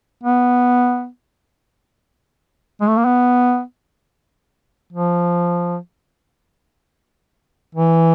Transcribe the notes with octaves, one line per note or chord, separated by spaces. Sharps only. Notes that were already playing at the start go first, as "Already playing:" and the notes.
B3
G#3
A3
A#3
B3
F3
E3